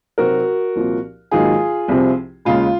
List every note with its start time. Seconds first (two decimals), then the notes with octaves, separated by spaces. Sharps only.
0.18 C3 F#3 C4 D#4 F#4 A#4
0.76 C2 A#2 F3
1.31 G#2 D#3 F#3 A#3 D#4 F4 G#4
1.88 C2 C3 F3 C4
2.45 D#2 C#3 G#3 F4